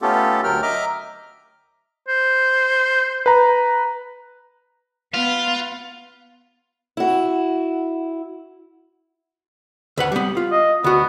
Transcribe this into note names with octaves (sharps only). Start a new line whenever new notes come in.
A3 B3 C#4 F4 G4 A4
D2 F#3 A#4 G5 F6
D#5 E5 A#5 D6 F6
C5
B4 A#5
B3 F4
E4 F#4
D2 B4 F#5
G3 B3
F4
D#5
D2 B3 F#4